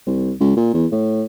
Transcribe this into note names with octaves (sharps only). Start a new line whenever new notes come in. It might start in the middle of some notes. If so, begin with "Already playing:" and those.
C2
C#2
A#2
E2
A2